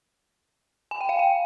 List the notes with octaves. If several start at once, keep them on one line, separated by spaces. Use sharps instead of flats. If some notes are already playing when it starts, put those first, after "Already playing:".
G#5
G5
F5
G5